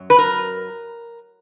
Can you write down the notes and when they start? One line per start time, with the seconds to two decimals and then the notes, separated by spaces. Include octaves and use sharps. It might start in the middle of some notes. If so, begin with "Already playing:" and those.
Already playing: F#2 F#3
0.10 B4
0.19 A#4